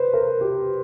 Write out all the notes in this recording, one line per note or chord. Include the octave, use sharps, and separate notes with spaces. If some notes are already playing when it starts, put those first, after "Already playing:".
Already playing: B4 C5
A#4
G4